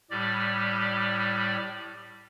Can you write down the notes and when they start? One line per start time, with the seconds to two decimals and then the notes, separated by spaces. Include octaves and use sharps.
0.11 A2 G3 G4 D5